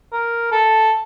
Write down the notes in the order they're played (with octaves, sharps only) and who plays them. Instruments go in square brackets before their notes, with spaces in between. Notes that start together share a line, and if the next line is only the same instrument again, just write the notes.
[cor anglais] A#4
A4